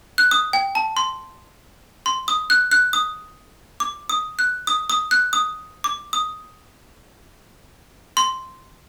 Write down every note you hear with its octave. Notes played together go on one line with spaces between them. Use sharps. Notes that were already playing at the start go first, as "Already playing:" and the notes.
F#6
D#6
G5
A5
C6
C6
D#6
F#6
F#6
D#6
D6
D#6
F#6
D#6
D#6
F#6
D#6
D6
D#6
C6